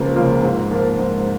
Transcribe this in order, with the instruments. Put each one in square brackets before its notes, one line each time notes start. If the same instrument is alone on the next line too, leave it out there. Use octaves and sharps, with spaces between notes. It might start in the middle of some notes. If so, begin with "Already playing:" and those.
Already playing: [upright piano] C#2 C#3 F3 A#3 F4
C#3 F3 A#3 F4
G#2
F3 A#3 F4 A#4
G#2